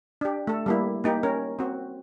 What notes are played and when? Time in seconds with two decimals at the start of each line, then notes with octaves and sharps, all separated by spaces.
0.21 D4 G4
0.47 A3 A4
0.66 G3 A#3 E4
1.04 A#3 D#4 G4
1.23 C#4 A#4
1.59 C4 F#4